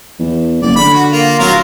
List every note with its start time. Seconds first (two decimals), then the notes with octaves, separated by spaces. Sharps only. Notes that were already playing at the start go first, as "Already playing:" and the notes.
0.19 E2
0.62 F#1 D5
0.76 D3 B5
0.93 F#4
1.12 A#3 F4
1.39 D1 F#3 F4 A#4